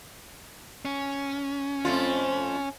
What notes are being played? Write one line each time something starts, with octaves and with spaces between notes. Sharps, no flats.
C#4
F2 A3 F4